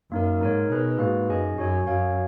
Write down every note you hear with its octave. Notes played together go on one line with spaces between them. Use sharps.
F#2 A#3 D#4 A#4
G#2 D#4 A#4 C#5
B2 D#4 G#4 B4
G#2 A#3 D#4 F#4 B4
F#2 D#4 G#4 D#5 G#5
F#2 F#4 C#5 G#5
F#2 F#4 C#5 F5 G#5